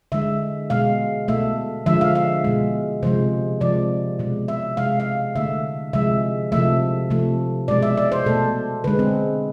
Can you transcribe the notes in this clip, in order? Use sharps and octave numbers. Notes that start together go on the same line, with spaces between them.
D3 G#3 E5
B2 G#3 F5
B2 A3 E5
D3 F3 G#3 E5
F5
E5
B2 G#3
C3 F3 G#3 C5
C3 F3 G#3 D5
B2 G#3
E5
C3 G#3 F5
F5
D3 A3 E5
C3 F3 G#3 E5
C3 F3 A3 E5
C3 F3 A3
B2 G#3 D5
E5
D5
C5
B2 A3 A4
D3 G#3 B4
C4